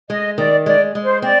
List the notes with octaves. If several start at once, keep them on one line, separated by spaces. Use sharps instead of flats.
G#3 D#5
D#3 D5
G#3 D5
G#3
C5
C4 D5